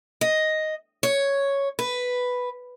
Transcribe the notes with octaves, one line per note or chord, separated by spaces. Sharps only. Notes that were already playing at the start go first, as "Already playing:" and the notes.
D#5
C#5
B4